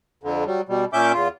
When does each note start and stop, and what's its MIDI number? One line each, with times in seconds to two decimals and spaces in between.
0.24 0.44 41
0.24 0.44 50
0.47 0.61 54
0.47 0.61 55
0.69 0.85 47
0.69 0.85 55
0.93 1.12 46
0.93 1.12 61
0.93 1.12 76
0.93 1.12 86
0.93 1.12 91
1.13 1.28 40
1.13 1.28 65